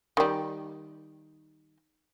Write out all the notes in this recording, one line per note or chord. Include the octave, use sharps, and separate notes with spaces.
D#3 G3